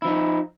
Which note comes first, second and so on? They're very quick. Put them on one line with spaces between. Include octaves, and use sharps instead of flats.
E4 F3 D#4